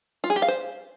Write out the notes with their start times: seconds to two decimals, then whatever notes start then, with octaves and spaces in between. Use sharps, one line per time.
0.24 F4
0.30 G#4
0.36 G4
0.42 F5
0.48 C5